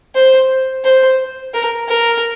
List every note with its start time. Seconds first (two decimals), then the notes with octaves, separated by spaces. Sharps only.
0.15 C5
0.84 C5
1.54 A#4
1.88 A#4